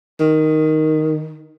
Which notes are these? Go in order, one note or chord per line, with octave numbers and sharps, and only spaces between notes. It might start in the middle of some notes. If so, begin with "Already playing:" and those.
D#3